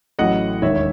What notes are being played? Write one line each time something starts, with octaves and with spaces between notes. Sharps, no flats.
A1 A2 F#3 D#5 F#5
E1 D#2 D#3 C#5 E5
C#5